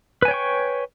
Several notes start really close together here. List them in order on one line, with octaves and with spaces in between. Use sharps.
B4 G#5 C#5 G5 C#6